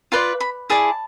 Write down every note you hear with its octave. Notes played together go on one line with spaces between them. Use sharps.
F4 B4 D5 C6
B5
E4 G#4 D5 A5